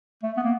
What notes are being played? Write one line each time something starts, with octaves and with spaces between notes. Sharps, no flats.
A3
B3
A#3